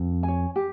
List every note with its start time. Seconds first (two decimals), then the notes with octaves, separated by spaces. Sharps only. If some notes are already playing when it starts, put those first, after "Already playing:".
Already playing: F2
0.23 C#5 G#5
0.56 G4